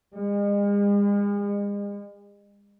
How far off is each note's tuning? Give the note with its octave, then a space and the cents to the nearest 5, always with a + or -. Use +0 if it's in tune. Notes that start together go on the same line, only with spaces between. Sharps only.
G#3 -40